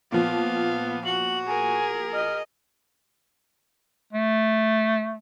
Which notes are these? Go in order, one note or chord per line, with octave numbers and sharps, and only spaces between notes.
A#2 F3 B3 F5
F#4 F#7
G#4 A#4 G#5
D#5 F6
A3